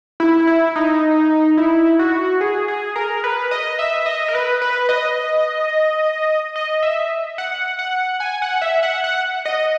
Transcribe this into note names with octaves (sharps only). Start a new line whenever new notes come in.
E4
E4
D#4
E4
F#4
G#4
G#4
A#4
B4
D#5
E5
D#5
A#4
B4
B4
D#5
D#5
E5
F#5
F#5
G#5
F#5
E5
F#5
F#5
D#5